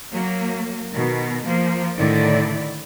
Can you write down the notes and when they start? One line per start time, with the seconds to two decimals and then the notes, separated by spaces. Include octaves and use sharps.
0.11 F#3 A#3
0.92 B2 D#3
1.44 F3 A#3
1.96 A2 D3 D#3 E4 D5